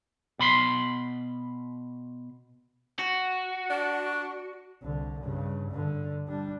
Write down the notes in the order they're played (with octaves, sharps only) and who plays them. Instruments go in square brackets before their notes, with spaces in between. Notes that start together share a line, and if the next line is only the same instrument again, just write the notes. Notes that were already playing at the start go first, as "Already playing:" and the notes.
[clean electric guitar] B2 B5 C6
[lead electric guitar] F#4
[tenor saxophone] D4
[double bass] C2 D3
G2 C#3
G2 D3
G3 D4